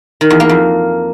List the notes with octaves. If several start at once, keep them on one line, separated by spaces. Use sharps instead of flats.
D#3
E2
A#3
F2